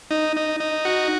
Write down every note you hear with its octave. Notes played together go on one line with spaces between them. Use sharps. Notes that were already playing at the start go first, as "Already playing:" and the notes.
D#4
D#4
D#4
F#4